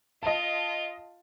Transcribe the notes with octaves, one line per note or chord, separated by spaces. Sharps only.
F4 D#5 A5